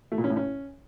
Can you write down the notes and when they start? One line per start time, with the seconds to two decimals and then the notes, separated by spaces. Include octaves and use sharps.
0.12 A3
0.18 A#2
0.24 C#4
0.30 A2
0.36 C#4